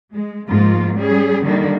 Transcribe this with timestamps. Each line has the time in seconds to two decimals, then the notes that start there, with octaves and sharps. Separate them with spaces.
0.13 G#3
0.49 G#2 F3 A#3 F4
0.95 G3 C#4 G#4
1.42 D3 D#3 G3 A#3 D4